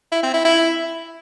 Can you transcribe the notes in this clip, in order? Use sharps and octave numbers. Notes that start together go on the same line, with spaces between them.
E4
C4
E4
E4